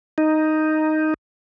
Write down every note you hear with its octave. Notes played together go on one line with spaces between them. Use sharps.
D#4